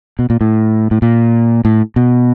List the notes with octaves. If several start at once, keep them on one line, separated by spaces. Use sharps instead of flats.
B2
A#2
A2
A2
A#2
A2
B2